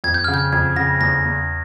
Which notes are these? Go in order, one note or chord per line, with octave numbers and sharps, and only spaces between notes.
F2 G#6
G6
C#3 F6
G6
F2 G#6
C#3 A#6
E2 A#6
E2